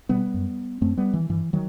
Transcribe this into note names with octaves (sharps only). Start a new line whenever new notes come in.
B2 G3 B3
F#2
F#2 A3 C4
G3 B3
E3
G2 E3
D#3 F#3